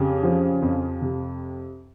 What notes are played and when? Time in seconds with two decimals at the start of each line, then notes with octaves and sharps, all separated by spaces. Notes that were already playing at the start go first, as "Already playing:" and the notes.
Already playing: F2 C#3 G4
0.23 F3
0.62 F2
1.02 C3